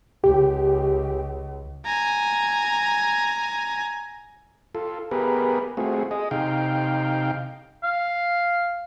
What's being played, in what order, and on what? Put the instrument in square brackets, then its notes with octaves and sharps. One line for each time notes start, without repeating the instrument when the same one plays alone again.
[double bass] C#2 [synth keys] G4
[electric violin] G#5 A#5
[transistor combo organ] F4 A4
B3 G4 G#4 A#4 B4
A3 C4 F4 F#4 G#4
G#4 D#5
C3 D#4 F5 G5
[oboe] F5